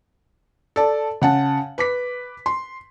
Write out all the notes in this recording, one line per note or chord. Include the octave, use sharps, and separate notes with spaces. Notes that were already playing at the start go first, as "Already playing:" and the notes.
A4 D5 A5
C#3 F#5 A5
B4 D6 B6
C6